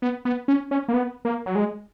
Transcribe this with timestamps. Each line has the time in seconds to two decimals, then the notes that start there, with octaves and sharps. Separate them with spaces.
0.02 B3
0.25 B3
0.48 C#4
0.71 C#4
0.88 A#3
0.94 B3
1.25 A#3
1.46 F#3
1.55 G#3